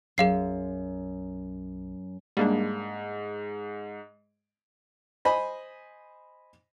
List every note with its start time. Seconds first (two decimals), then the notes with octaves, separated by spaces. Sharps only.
0.18 B1 F#2 G#4 F5 C7
2.37 G#2 G3 A#3 D4
5.25 C5 D#5 G#5 B5